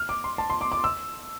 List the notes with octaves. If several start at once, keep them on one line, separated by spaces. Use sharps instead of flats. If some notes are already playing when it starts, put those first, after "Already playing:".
Already playing: F6
D6
C6
A5
C6
D6
D6
E6